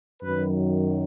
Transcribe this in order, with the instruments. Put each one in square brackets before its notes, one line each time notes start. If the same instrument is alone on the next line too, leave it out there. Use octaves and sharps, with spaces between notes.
[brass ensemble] F#2 D#3 F#3 B4